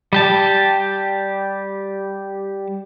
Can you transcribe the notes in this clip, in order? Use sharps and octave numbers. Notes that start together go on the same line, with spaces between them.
G3 G4 A5